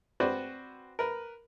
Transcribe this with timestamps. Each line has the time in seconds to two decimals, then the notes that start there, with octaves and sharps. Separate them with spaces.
0.20 C4 F#4 B4 C5 D5
0.99 A#4 B4